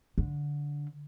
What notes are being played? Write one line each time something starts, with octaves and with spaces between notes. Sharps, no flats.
D3